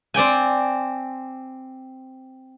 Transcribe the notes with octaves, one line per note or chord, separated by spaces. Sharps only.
C4 D5 G5 G#5